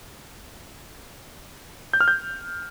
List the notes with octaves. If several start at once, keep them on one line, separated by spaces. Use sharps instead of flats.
G6
F6
G6